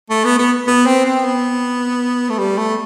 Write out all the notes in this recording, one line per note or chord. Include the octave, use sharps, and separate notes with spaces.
A3
B3
B3
B3
C4
C4
B3
A3
G3
A3